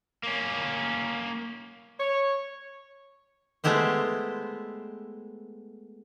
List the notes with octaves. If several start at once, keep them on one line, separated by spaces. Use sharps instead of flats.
A#3 C#4
C#5
G#3 A3 B3 E4 G4 C5